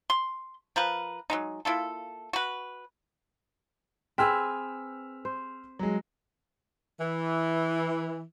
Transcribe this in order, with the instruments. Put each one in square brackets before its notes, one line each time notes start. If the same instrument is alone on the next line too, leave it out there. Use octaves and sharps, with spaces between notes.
[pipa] C6
F3 A#4 B4
F#3 G#3 D#4
A#3 E4 F4 A4
F#4 B4
[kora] C4 G#4 B4 [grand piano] E6 F6 B6
[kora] C5
[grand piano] F#3 G#3
[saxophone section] E3